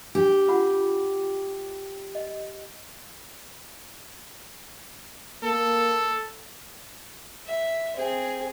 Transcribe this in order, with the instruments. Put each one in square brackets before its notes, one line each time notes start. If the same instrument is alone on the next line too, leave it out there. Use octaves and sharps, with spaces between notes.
[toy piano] D4 [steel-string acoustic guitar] G4
[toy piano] F4 F#5 B5
D#5
[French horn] A#3 [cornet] A4
[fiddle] E5
C4 G#4